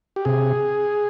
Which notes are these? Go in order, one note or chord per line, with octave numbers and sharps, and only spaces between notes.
G4
C3 G#4